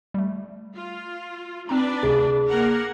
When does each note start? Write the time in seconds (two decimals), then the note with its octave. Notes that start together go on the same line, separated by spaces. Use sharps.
0.14 G3 A3
0.74 F4
1.69 C4 D4 D#4 B4 A#5
2.03 D2 C3 G#4
2.48 A#3 A#4 F#5